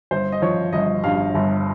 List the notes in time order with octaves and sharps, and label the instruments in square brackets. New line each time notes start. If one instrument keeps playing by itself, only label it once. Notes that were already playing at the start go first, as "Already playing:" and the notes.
[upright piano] G1 C5
D#5
F3 C#5
G1 D#5
G2 F5
G1